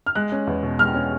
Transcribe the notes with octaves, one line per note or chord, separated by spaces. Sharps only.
F6
G#3 F#6
C#4
E2
B2
G#3 F6
C#4